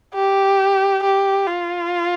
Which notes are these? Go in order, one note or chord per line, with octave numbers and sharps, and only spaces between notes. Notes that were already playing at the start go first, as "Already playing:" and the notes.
G4
G4
F4